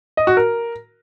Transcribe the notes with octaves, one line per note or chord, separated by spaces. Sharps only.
D#5
F#4
A#4